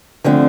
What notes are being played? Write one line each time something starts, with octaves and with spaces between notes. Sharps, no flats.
D3 F3 A3 C4